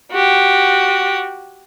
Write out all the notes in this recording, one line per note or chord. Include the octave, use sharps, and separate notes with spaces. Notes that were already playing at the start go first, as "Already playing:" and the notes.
F#4 G4